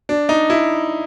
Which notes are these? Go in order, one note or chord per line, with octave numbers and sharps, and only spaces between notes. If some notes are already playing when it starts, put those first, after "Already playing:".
D4
D#4
E4